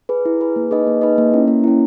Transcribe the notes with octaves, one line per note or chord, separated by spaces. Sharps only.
G#4 B4
E4
G#4 B4
A#3
D#4 G#4 B4 D#5
A#3
D#4 G#4 B4 D#5
A#3
C#4 E4
A#3
C#4 E4